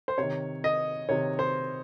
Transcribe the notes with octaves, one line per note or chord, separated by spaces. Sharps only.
C5
C3 D#3 C#5
D#5
C3 D#3 C#5
C5